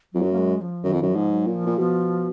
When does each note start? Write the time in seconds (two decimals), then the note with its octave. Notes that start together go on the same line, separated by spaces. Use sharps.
0.13 F2 F#3
0.22 F#2
0.32 A#3
0.38 G#3
0.61 F3
0.84 F#2 D#3
0.93 F2
1.02 F#2
1.08 F3
1.16 G#2
1.31 F#3
1.47 A#2
1.54 F3
1.66 A#2
1.78 B2 F3